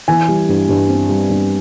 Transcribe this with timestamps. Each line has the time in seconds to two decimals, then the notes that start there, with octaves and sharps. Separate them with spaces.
0.08 E3 G#5
0.28 G3
0.49 G2
0.69 G2
0.89 C4
1.09 G3
1.30 G2